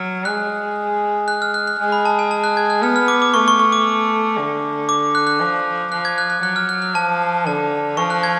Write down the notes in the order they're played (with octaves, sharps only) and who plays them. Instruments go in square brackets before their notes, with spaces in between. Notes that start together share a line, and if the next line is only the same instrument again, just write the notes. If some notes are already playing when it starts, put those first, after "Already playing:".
Already playing: [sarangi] F#3 [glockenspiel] F6
[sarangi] G#3 [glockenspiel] F#6
[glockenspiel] F#6
F6
F#6
F#6
[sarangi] G#3
[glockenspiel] B5
A5
G#5
A5
F#6
G#6
F#6
[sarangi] B3 [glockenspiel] F6
[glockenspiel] F6
D6
D6
[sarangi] A3 [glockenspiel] C#6
[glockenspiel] C#6
C#6
D6
[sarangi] D3
[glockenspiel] D6
F#6
F#6
[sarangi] F3
[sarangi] F3 [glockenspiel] F#6
[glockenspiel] G#6
F#6
F#6
[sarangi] F#3 [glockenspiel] F#6
[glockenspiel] F6
F#6
F#6
[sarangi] F3 [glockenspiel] A5
[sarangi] D3 [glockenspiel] A5
[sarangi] F3 [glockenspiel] C#6
[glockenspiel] F#6
G#6